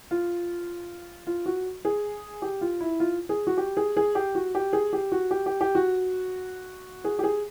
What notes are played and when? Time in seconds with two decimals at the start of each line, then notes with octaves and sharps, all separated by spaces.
0.11 F4
1.27 F4
1.46 F#4
1.85 G#4
2.42 G4
2.61 F4
2.81 E4
3.00 F4
3.29 G#4
3.47 F#4
3.57 G4
3.77 G#4
3.97 G#4
4.15 G4
4.35 F#4
4.55 G4
4.73 G#4
4.93 G4
5.12 F#4
5.31 G4
5.46 G4
5.61 G4
5.75 F#4
7.04 G#4
7.19 G4
7.24 G#4